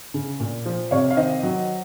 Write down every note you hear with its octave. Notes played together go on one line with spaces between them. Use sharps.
C#3
A#2
F3
C3 C#5 F5
F5
D#3 C5 D#5
F#3